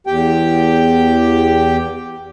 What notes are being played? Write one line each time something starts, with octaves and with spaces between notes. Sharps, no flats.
E2 G4 G5